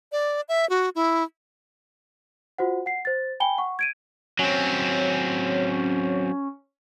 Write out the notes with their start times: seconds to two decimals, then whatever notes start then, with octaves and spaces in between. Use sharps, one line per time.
0.12 D5
0.49 E5
0.69 F#4
0.95 E4
2.58 F4 F#4 C5 F#5
2.86 F#5 C7
3.05 C5 A6
3.40 G5 G#5 B5 G7
3.58 F#5 C#6
3.79 G#6 D7 D#7
4.39 F#3 C4 C#4